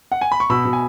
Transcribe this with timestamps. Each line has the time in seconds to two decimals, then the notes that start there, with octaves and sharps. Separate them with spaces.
0.12 F#5
0.21 G#5
0.32 B5
0.40 C#6
0.50 B2 B5 E6
0.65 B2
0.73 G#5